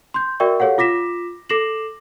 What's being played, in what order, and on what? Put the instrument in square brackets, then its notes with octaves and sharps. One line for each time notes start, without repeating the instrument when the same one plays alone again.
[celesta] C6 G6
F#4 A#4 D5 E5 G5 C#6
G4 A4 C#5 F5 F#5
F4 D6 A#6 B6 E7
A4 D6 A#6 C7 E7 F#7